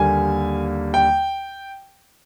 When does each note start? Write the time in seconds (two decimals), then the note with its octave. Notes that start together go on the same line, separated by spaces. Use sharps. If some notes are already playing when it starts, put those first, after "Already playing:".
Already playing: D#2 D3 G3 A#3 G#5
0.94 G5